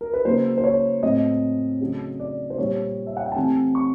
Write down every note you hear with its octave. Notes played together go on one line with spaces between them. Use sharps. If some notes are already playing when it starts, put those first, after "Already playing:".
A#4
B4
C#3 F#3 A#3 C5
C5
C#5
A2 F#3 A3 C4 D#5
C#3 F#3 A3
D5
C5
A#2 G3 B3 C#5
E5
F#5
G5
A5
C3 E3 A3 C4 G#5
C#6